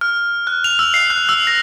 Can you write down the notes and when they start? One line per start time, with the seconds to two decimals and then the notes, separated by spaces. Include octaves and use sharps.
0.01 F6
0.47 F#6
0.64 F7
0.79 E6
0.94 C7
1.10 F#6
1.29 E6
1.47 A#6